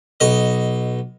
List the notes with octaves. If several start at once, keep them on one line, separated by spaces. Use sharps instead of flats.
B1 D#5